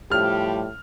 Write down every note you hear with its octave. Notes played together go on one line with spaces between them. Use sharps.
A2 F3 G3 G4 F6